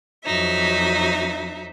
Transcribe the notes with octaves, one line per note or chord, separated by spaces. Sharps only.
F2 F#3 D#4 E5